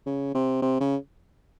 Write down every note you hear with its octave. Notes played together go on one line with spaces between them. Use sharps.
C#3
C3
C3
C#3